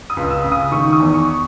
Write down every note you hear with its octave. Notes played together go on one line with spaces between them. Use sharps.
D#6
C#2
E6
C#3
D#6
D#3 C#6
D#6
E2
C#6